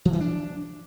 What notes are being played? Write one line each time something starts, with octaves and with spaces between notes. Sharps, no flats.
F3
E3
D4